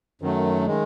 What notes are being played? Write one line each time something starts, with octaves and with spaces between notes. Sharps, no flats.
F#2 D#3 F#3 A3
D#3 G#3